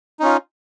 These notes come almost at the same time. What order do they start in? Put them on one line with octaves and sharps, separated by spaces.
D#4 C#4 F4